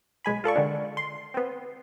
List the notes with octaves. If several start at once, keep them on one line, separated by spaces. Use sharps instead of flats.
B1 G#3 G#5 B5
F4 A4 D5 C#6
D3 D#3 G#3 D4
C6
B3 C4